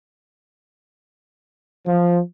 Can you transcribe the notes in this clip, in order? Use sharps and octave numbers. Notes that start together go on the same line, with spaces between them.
F3